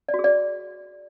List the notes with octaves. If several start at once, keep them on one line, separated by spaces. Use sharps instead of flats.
D5
F#4
G#4
D5